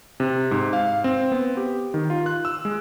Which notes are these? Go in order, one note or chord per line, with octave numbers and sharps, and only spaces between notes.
C3
G#2
F5
C4
B3
G4
D#3
F4
F#6
E6
G#3